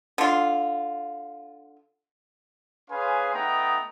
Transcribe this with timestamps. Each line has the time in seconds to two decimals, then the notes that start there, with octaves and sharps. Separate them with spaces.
0.18 D3 F4
2.91 C#4 G#4 B4 F5 G#5 C6
3.34 A3 B3 D#4 G5 A#5 D#6